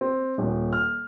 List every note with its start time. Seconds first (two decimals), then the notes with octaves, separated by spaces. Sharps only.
0.01 C4
0.38 D#1
0.73 F6